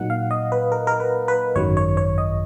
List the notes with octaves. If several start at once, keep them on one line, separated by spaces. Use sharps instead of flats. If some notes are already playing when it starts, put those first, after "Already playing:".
Already playing: A#2 F#3 A#3 D#4 F#5
F5
D#5
B4
A#4
A#4
B4
B4
G#1 F#2 D#3 F#3 C#5
C#5
C#5
D#5